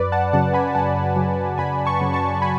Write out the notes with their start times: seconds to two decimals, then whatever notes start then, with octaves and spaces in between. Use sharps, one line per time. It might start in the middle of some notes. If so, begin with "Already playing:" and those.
Already playing: F#2 B4 D5
0.12 F#5 A5
0.33 C#3 F#3 F#5 A5
0.54 G#5 B5
0.75 F#2 F#5 A5
1.16 C#3 F#3
1.58 F#2 G#5 B5
1.85 A5 C#6
2.01 C#3 F#3
2.13 A5 C#6
2.42 G#5 B5